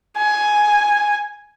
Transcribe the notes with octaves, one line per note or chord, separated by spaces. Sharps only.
G#5